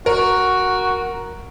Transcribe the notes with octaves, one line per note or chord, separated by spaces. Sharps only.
F#4 A#4